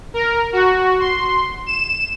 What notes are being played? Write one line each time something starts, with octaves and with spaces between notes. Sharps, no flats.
A#4
F#4
C6
E7